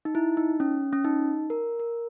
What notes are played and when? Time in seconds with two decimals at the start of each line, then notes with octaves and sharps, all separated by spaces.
0.05 D#4
0.15 E4
0.37 D#4
0.60 C#4
0.93 C#4
1.04 D#4
1.50 A#4
1.80 A#4